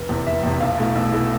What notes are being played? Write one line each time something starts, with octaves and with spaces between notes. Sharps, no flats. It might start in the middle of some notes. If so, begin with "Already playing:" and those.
Already playing: F1
E2 C3
F1 E5
E2 C3
B1 F5
B2 A3 E4
B1 E6
B2 A3 E4